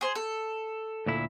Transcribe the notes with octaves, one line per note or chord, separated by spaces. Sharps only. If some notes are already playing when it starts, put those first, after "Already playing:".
G#4 C5
A4
D2 A#2 E4